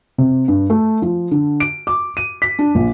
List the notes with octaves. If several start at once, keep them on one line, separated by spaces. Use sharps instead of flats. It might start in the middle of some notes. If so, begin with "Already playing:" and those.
C3
G2
A3
F3
D3
D7
D6
D#7
B6
D4
A#1